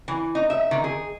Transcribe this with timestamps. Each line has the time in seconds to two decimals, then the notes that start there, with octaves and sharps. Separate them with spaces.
0.08 E3
0.35 D#4
0.50 E5
0.71 D#3
0.84 G#4